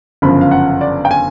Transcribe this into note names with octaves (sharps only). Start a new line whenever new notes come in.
G1 F#2 C#3 F3 B5
F5
F#5
D5
G5
G#5